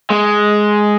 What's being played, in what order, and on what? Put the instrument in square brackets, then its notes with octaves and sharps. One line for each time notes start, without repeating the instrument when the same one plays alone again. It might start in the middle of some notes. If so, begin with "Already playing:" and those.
[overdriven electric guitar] G#3